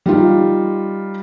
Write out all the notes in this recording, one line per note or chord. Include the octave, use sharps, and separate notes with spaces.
G3 D#4 F4